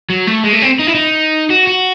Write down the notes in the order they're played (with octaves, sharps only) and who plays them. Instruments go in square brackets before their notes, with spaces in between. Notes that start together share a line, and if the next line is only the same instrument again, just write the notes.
[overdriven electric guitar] F#3
A3
G#3
A3
C4
D#4
E4
D#4
F#4
F#4